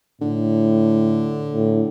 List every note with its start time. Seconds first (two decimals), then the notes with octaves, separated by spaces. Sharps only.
0.21 A2 D3
1.52 A2